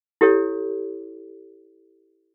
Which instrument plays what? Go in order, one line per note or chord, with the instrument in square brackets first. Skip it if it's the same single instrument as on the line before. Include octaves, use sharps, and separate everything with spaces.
[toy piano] E4 G4 A4 C#5